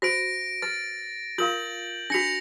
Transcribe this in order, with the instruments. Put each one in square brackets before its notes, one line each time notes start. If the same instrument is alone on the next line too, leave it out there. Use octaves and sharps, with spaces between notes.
[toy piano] F#4 C5 [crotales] A#6 D7
[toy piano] B4 [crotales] A6
[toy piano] F4 A#4 F5 [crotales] G6 F#7
[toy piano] D4 F#4 [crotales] A#6 C#7 F7